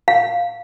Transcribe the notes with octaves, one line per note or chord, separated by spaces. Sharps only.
F5